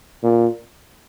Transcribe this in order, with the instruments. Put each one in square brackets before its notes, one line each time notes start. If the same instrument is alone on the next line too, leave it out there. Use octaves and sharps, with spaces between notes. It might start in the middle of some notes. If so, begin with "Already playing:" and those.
[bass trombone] A#2